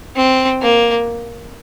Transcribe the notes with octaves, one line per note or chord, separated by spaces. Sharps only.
C4
A#3